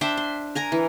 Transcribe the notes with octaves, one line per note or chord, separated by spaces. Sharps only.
D4 C5 E5 G5
C6
A#4 G#5 A#5
E3